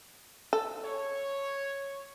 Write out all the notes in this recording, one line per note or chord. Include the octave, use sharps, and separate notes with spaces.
A4
C#5